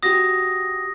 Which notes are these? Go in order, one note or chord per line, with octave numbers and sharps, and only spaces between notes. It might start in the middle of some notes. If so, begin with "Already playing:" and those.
F#4 G4 D#6 A#6